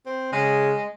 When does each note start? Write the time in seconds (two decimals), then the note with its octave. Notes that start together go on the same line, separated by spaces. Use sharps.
0.06 C4
0.32 C#3 G#3